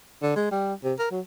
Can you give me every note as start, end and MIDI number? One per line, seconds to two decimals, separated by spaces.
0.22 0.35 50
0.36 0.49 56
0.51 0.74 55
0.84 0.94 48
0.99 1.08 70
1.11 1.20 54